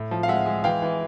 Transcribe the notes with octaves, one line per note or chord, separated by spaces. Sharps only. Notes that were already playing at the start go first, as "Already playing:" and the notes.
Already playing: A2
F3
F5
G#3 E5 F#5
G#3
E3 F5 G5
E3